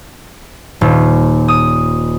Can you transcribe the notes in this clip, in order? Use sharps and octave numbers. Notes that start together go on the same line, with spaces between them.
D#1
D#6